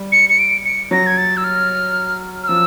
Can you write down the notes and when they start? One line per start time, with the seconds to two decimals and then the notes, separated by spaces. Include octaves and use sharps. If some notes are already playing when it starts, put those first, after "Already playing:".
Already playing: G3
0.12 C#7
0.29 C#7
0.39 D7
0.65 C#7
0.91 F#3 A#6
1.06 G#6
1.17 A6
1.37 E6
1.44 F6
2.43 F6
2.48 F3 E6